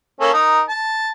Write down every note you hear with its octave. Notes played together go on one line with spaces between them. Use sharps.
A#3 C#4 A4
D#4 A#4
A5